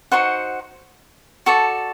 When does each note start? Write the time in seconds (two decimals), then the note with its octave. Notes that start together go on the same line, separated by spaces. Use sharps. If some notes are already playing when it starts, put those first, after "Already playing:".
0.12 D#4 F#4 C5 F#5
1.46 F#4 A4 D5